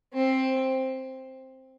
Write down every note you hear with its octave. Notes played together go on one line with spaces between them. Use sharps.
C4